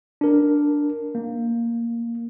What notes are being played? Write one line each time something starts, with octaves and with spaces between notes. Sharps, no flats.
D4 A#4
A#3